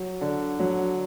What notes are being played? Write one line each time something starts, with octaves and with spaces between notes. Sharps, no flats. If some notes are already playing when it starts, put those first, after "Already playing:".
Already playing: F#3
D3
F#3